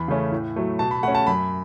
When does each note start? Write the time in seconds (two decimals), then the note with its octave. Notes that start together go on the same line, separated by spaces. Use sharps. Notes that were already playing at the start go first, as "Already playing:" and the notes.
Already playing: E2 B5
0.08 C#3 A3 C#4
0.32 A2
0.56 F#3 A3
0.79 B2 A5
0.91 B5
1.03 A3 C#4 F#5
1.15 A5
1.27 F#2 B5